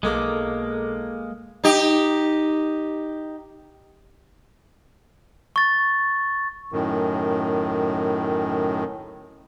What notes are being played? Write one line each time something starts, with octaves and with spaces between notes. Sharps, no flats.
B1 G#3 A#3 A4 D6
D#4 G4
C#6 A6
F#2 A2 D#3